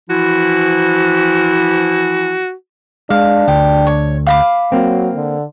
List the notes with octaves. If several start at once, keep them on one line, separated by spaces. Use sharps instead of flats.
E3 F3 E4 F#4
G#3 D4 F5
D2 G4
C#5
F5 B5 D6
F#3 A#3 C4
D3